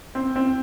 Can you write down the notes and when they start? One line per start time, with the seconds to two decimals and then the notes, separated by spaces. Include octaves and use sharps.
0.15 C4
0.36 C4